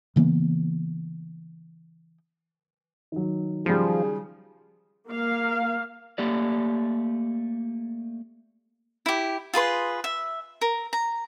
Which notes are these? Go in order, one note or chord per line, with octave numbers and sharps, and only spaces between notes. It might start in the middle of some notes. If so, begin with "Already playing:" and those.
C#3 E3 A#3 B3
D#3 F#3
C#3 F3 G3 G#4
A#3 F5
A3 A#3 G4 D5
E4 G4
F4 G#4 B4 C6
E5
A#4
A#5